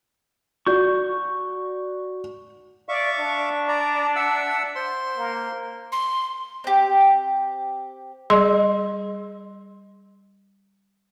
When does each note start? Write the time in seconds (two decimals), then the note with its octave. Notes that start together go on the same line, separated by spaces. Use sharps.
0.66 F#4 D5 C#6 G6
2.89 D5 E5 F5 C#6
3.19 D4
3.68 D5 A#5
4.16 E5 F#5 E6
4.76 C5 C6
5.17 A#3
5.92 C6
6.64 C4 G4
8.30 G3 G#4 D#5 C6